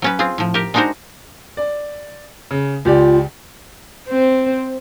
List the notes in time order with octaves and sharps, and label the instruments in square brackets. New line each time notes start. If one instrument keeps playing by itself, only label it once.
[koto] F#3 C#4 B4
C4 F4 G#4
A2 F3
G4 A#4
G#3 D4 D#4 F#4 A#4 C5
[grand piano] D5
C#3
[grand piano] C#2 G4 D5 [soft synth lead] F4
[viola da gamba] C4 C5